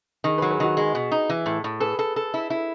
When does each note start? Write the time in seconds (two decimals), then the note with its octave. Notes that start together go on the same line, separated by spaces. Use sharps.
0.24 D#3 G#4
0.38 G#4 B4
0.42 F#3
0.50 G#4 B4
0.60 D#3 F#4
0.77 G#3 G#4
0.95 B2
1.12 D#4
1.29 E3
1.46 A2
1.64 A2
1.80 G#4 A4 B4
1.99 A4
2.16 A4
2.34 E4
2.50 E4